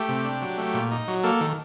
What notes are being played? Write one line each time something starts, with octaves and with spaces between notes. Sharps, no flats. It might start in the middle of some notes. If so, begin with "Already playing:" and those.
Already playing: A3 G4
C3
D4
F#3
A3
A#2
D#4
F#3
A#3 A4
D#3